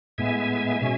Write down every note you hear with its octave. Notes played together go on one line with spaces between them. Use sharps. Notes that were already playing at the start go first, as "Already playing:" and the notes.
A2 G#3 B3 E5 G#5
B2 G#3 C#4